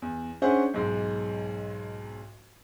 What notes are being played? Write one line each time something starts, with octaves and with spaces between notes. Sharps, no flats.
E2
C#4 D4 G#4 C5 E5 F#5
B1 G#2